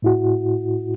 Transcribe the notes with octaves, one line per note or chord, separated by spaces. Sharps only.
A2 E4 F#4